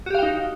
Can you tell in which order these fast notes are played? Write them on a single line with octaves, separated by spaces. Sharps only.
F#4 G4 F5 G5 D#4